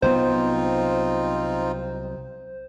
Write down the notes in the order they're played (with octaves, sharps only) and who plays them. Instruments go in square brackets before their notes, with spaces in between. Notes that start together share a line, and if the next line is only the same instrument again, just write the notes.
[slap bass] C2 F#3 B3 [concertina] C4 D#4 F4 [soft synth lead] C5